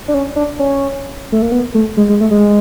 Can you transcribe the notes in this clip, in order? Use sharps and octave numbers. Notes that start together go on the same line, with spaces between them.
D4
C#4
D4
C#4
A3
A#3
B3
A3
G#3
G#3
A3
G#3